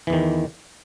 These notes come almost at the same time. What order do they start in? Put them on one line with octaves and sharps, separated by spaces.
E3 E2 D#3